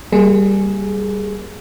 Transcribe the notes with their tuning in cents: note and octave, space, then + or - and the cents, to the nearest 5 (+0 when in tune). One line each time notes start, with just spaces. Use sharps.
G3 +0 A#3 -10 G#4 +15